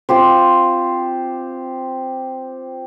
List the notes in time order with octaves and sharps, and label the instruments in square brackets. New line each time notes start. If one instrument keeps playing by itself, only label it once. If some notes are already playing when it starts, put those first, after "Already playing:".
[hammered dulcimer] C4 F4 G4 C5